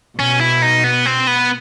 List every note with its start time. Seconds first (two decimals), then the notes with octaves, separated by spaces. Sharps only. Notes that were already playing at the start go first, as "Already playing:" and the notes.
0.18 B2 C#4
0.41 E4
0.62 D#4
0.84 B3
1.06 C4
1.27 B3